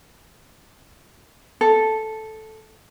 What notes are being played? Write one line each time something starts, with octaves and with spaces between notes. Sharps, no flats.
A4